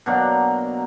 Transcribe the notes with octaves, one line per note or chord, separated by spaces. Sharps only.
B2 F#3 A#3 D4